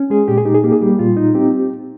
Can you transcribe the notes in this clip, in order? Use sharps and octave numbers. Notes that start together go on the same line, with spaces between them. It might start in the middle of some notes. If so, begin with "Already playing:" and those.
Already playing: C#4
G#3 G#4
A#2 G4
G#4
D#4 G4
G#4
A#3 G4
G#4
G3 G4
A#2 F4
D#4
C4 G4